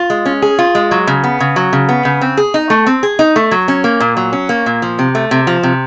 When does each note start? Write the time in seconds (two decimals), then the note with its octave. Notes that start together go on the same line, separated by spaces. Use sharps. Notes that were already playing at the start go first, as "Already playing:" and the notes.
Already playing: F4
0.10 G#3
0.26 C#4
0.42 G#4
0.59 F4
0.75 G#3
0.91 F#3
1.07 C#3
1.24 B3
1.40 C#3
1.56 F#3
1.73 C#3
1.89 B3
2.05 C#3
2.21 C4
2.37 G#4
2.54 D#4
2.70 A3
2.86 C4
3.03 G#4
3.19 D#4
3.36 A3
3.51 F#3
3.68 C#4
3.84 A#3
4.00 A#2
4.17 F#3
4.33 C#4
4.49 A#3
4.66 A#2
4.82 F3
4.99 C3
5.15 A3
5.31 C3
5.47 F3
5.63 C3